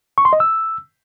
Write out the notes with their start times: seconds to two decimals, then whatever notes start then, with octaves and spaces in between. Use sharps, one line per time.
0.18 C#6
0.25 C6
0.33 D#5
0.40 E6